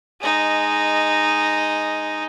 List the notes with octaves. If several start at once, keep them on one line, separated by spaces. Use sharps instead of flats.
G#3 D#4